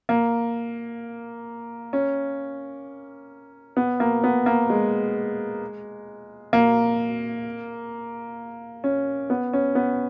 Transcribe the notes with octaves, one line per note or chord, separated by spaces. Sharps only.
A#3
C#4
B3
A#3
B3
A#3
G#3
A#3
C#4
B3
C#4
B3